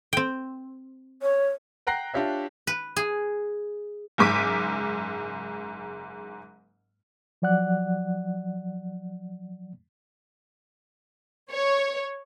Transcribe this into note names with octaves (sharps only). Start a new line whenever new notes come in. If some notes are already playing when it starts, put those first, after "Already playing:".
C4 G5
C#5
F#5 G5 A#5 F#6 A#6 C7
D4 F4 G4 C#5 E5
B4
G#4
F#1 G#2 D6 B6 D#7
F3 F#3 D5 F#5 F#6
C#5